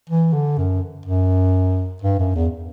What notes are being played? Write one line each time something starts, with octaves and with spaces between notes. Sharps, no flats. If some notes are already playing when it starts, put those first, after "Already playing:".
E3
D3
F#2
F#2
G2
F#2
E2